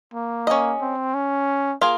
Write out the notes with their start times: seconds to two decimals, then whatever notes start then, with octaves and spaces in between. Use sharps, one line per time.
0.14 A#3
0.47 C#4 G#4 D#5
0.81 C4
1.14 C#4
1.81 A#3 F4 G#4